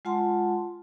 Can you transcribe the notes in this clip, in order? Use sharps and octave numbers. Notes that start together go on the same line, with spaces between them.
G#3 F4 F#5 A5 C6